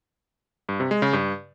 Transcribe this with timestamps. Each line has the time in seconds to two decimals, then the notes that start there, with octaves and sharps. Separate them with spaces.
0.69 G2
0.80 C3
0.91 G#3
1.02 C#3
1.13 G2